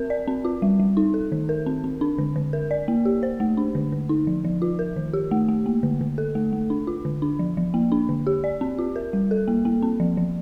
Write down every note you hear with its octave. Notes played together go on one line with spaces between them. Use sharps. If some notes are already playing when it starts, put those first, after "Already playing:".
Already playing: C4 A#4
D5
C4
F4
G3
G3
D#4
A4
D#3
A#4
C4
C4
D4
D3
D3
A#4
D5
A#3
G4
C5
A3
D4
D3
D3
D#4
F3
F3
F4
A#4
D#3
G4
A3
A3
A#3
D3
D3
A4
A3
A3
D4
F4
D3
D4
F3
F3
A#3
D4
D3
G4
D5
C4
F4
A#4
G3
A4
A#3
A#3
C4
F3
F3